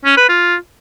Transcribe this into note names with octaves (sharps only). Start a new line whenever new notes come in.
C#4
B4
F4